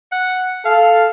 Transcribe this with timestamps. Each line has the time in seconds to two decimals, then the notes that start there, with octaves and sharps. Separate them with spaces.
0.12 F#5
0.65 A4 F5